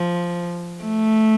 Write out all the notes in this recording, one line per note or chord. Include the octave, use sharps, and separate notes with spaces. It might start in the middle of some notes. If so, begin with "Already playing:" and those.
Already playing: F3
A3